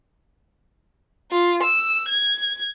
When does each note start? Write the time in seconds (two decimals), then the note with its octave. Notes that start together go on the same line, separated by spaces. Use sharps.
1.32 F4
1.63 E6
2.08 G#6